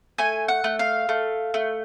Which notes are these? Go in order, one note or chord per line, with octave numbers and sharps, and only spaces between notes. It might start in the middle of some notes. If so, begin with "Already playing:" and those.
A3 G#5
F#5
A3
F5
A3
A3